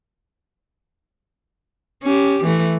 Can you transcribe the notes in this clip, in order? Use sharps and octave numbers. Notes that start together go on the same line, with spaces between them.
C#4 G4
E3 A3